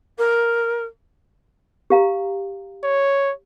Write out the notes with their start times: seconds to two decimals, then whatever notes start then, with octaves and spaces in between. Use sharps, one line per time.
0.18 A#4
1.90 G4 F5 A#5
2.84 C#5